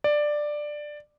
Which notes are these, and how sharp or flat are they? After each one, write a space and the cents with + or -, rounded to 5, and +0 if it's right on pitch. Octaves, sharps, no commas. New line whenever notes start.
D5 +10